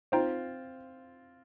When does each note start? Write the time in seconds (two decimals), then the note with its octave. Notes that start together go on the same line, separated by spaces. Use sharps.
0.12 C4 D#4 F4 C5 G5